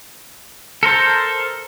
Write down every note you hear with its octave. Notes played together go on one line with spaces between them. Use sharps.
A4 A#4 C5 A5